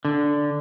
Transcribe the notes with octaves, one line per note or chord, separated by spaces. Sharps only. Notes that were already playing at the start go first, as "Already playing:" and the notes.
D3